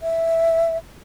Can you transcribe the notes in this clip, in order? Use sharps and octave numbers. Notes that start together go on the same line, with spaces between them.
E5